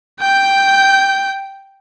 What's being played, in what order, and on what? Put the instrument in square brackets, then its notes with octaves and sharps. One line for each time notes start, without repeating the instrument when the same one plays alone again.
[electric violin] G5 G6